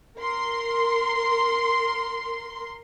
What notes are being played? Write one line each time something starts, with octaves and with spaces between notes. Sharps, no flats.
A#4 C6